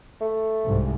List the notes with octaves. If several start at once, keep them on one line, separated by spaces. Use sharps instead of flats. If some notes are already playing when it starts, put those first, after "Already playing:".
A3
C2 G#2